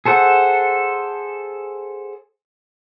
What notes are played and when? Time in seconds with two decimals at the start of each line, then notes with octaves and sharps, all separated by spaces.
0.06 G#4 A4 C5 F#5